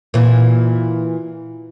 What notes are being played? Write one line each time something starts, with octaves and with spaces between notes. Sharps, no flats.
A#2 E3